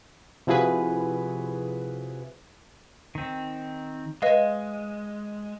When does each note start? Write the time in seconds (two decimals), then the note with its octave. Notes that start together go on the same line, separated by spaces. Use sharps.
0.47 C3 F3 E4 F#4 G#4 B4
3.15 D#3 C4
4.22 G#3 B4 D#5 F5